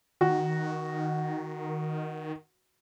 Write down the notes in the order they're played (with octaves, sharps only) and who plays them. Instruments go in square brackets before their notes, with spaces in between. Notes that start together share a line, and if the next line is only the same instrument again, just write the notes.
[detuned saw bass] D#3 [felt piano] F#4